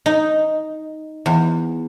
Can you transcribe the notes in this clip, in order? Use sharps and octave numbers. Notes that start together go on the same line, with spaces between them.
D#4
E2